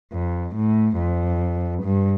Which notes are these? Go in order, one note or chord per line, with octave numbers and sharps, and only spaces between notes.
F2
A2
F2
G2